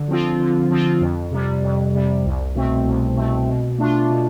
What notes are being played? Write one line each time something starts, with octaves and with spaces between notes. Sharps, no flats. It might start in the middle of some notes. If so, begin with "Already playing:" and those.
Already playing: D3
F3 C4 F4
D3
F3 C4 F4
F2
C3 G3
F2
C3 G3
C2
B2 A3 C4
C2
B2 A3 C4
B2
A3 D4 F4
B2